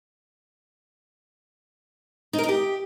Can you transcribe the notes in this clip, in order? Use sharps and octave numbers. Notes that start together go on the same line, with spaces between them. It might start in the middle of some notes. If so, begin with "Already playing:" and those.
D#4
A#4
D#4
G4